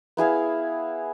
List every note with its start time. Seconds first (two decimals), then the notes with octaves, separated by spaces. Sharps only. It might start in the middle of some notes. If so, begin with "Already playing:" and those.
0.17 B3 E4 G#4 F5